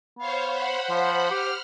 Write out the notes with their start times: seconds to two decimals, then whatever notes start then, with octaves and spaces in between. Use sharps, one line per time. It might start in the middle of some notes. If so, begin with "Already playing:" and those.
0.19 B3 C5 C#5 F5
0.49 C5 F#5 B5
0.90 F3
1.31 G4 F6